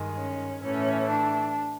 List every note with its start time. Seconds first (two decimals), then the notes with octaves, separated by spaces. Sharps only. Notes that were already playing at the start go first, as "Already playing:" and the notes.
Already playing: G2 D#3 G#3
0.16 C#4
0.62 A2 E3 A3 C#4
1.08 D4